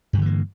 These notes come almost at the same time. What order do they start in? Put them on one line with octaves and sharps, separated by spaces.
G2 D3 E3 A#3